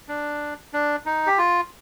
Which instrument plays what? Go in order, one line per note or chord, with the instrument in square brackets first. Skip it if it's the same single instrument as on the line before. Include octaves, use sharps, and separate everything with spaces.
[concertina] D4
D4
D#4
G4
F4